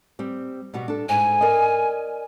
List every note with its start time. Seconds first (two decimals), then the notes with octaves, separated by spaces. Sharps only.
0.19 G3 C4
0.74 B2 G3 F#4
0.88 D4 A4
1.09 G#2 G#5
1.41 A#4 D5 D#5